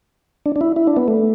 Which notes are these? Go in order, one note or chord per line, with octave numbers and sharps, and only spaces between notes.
D4
D4
E4
E4
D4
B3
A3